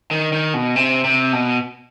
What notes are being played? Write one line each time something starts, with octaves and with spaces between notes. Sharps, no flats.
D#3
D#3
B2
C3
C3
B2